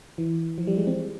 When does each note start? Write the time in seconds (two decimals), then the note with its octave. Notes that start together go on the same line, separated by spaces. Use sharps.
0.18 E3
0.58 F3
0.67 G3
0.78 G#3
0.87 C4